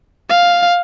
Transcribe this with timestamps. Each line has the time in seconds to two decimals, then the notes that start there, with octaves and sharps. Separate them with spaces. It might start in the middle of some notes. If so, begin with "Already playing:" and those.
0.30 F5